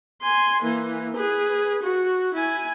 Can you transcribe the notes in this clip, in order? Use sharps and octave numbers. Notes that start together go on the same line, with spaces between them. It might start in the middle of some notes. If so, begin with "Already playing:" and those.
G#5 C6
E3 A#3
G#4 B4
F#4
E4 G#5